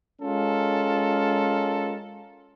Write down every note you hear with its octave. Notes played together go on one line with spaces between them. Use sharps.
G#3 C#4 F4 A4 A#4